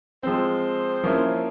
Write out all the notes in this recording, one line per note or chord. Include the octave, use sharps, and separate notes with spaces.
F3 G#3 C4 C5
F3 A#3 C#4 E4